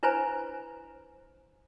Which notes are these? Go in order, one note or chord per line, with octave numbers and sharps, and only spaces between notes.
D4 E4 B4 C5 G#5 A#5